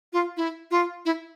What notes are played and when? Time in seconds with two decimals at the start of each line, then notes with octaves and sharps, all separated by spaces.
0.13 F4
0.37 E4
0.71 F4
1.05 E4